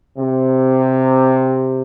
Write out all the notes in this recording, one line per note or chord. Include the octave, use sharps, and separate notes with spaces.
C3